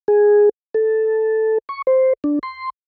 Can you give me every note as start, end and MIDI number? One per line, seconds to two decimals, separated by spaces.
0.08 0.49 68
0.74 1.58 69
1.69 1.82 85
1.87 2.13 72
2.24 2.39 62
2.43 2.70 84